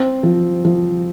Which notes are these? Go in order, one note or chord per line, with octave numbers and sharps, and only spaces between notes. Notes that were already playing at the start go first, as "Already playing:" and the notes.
Already playing: C4
F3
F3